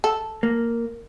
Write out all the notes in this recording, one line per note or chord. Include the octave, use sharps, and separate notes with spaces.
A4
A#3